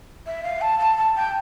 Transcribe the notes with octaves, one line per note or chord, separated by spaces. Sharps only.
E5
F5
A5
A5
A5
G5